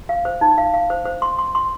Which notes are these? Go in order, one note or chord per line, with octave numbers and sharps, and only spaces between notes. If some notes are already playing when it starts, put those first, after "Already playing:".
F5
C5
D#4
F5
F5
C5
C5
C6
C6
C6